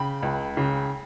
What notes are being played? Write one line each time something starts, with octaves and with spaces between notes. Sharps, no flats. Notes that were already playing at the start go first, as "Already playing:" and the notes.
Already playing: C#3 G5 B5
C#2
C#3